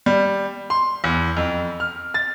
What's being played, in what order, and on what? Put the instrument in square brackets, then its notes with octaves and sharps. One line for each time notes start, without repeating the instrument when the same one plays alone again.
[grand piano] G3
C6
E2
F2
F6
A6